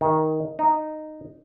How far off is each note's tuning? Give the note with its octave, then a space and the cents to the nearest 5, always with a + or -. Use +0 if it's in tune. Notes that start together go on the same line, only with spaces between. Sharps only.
D#3 +10
D#4 -10